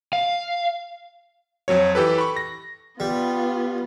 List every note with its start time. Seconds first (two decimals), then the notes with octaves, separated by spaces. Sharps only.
0.13 F5
1.68 F2 F#3 C#5
1.95 E3 G4 A4 B4
2.18 B5 C#6
2.37 A#6
3.00 G3 B3 F4